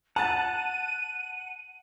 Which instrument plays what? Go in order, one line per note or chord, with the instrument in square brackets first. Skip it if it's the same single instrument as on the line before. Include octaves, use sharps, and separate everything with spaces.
[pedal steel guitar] F#5 [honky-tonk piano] A5 F#6 A6 [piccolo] D#7